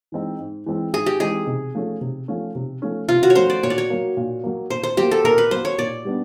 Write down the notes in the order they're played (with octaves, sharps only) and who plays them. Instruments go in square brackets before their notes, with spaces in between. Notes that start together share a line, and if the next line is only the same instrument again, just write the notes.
[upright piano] E3 G#3 C4 D#4
G#2
E3 G#3 C4 D#4
[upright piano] G#2 [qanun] G#4
[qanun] G4
[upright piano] E3 G#3 C4 D#4 [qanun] G#4
[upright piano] C3
F3 A3 C#4
C3
F3 A3 C#4
C3
F3 A3 C#4
[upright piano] C3 [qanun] F4
[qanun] F#4
C#5
[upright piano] F3 A3 C#4 [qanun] C5
[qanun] D5
[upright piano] A#2 [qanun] C#5
[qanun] D5
C#5
[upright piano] F#3 A#3
A#2
F#3 A#3
[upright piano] A#2 [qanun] C5
[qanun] C5
[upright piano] F#3 A#3 [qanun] G4
[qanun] A4
[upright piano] A#2 [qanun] A#4
[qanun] B4
[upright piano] F#3 A#3 [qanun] C5
[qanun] C#5
[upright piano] A#2 [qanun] D5
[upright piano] G3 B3 D4